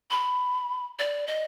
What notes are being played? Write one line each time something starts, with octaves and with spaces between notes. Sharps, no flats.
B5
D5
D#5